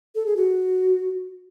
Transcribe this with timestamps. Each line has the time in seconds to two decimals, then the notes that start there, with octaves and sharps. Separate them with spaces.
0.15 A4
0.26 G#4
0.36 F#4